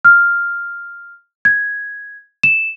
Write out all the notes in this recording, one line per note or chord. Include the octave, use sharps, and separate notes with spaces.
F6
G#6
E7